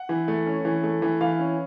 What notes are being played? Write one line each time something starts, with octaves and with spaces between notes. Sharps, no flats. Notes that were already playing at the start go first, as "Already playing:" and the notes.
Already playing: F#5
E3
A3
C#4
E3
A3
E3
E3 F5
C#4